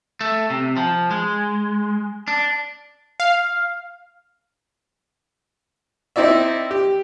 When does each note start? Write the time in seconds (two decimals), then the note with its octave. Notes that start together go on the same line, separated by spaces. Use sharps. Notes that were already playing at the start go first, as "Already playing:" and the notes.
0.21 A3
0.50 C3
0.77 F3
1.11 G#3
2.28 D4
3.20 F5
6.16 C4 D#4 E4 D5 E5
6.71 G4